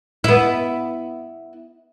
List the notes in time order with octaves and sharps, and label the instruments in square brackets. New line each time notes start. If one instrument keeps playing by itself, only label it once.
[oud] B3 E4